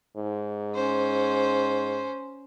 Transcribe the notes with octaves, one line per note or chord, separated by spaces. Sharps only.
G#2
C#4 C5